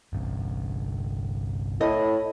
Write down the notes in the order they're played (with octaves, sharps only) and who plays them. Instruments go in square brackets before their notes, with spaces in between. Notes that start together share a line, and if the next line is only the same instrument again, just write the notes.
[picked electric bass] G1 C2
[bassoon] A2 [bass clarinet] E4 [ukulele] D#5